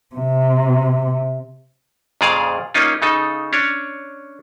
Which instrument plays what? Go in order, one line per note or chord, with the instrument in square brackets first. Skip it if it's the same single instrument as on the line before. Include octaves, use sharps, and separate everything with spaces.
[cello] C3
[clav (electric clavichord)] F2 A#2 C#3 G#4 D5 F5
A#3 C#4 D#4 F4
C#3 D#4 A4
C#4 D4 C#5